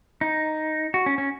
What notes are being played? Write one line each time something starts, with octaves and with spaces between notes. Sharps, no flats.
D#4
F#4
C#4
C#4